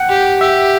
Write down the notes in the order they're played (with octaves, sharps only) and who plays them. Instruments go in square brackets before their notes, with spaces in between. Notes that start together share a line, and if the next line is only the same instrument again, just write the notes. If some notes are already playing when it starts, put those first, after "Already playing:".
Already playing: [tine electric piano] F#5 G5
[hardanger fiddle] G4
[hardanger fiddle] G4 [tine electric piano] E5